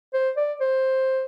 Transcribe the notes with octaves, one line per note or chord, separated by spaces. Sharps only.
C5
D5
C5